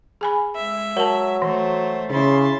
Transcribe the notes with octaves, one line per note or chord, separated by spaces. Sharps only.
G#4 G#5 B5
G#3 E5
F#3 A#4 A5
E3 A3 C5
C#3 E4 C6 A6